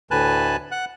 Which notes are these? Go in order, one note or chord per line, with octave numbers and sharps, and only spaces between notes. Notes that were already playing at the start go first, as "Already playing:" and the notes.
D2 A2 B4 G#5 A5 F#6
F#5 F#6